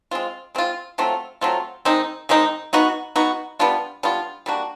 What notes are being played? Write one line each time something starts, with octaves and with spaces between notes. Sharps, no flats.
G#3 C4 F4
G#3 C4 F4
F#3 A3 C4 F4
F#3 A3 C4 F4
D#3 G#3 C4 D#4
D#3 G#3 C4 D#4
B3 D#4 F#4
B3 D#4 F#4
G3 B3 D4 F4
G3 B3 D4 F4
G3 A#3 D4 F#4